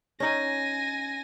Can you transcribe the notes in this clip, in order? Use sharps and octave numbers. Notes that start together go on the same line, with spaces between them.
C#4 D#4 G#5 A#6